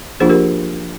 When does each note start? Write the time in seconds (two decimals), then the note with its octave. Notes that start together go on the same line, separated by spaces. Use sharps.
0.20 F3 A#3 D4 F4 G#4 C5
0.29 G4 A#4